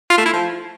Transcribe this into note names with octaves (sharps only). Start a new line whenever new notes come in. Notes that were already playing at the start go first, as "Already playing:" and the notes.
F4
A3
E4
F3